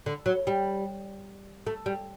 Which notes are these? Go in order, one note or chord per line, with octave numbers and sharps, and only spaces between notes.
D3
F#3
G3
A3
G3